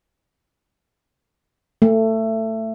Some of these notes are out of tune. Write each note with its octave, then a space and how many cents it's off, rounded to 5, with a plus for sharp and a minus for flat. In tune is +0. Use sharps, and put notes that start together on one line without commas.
A3 +20